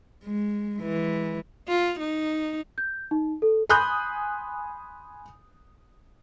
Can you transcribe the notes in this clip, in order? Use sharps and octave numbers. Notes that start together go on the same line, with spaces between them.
G#3
E3 G#3
F4
D#4
G6
D#4
A4
G#5 B5 C6 D#6 F#6 G6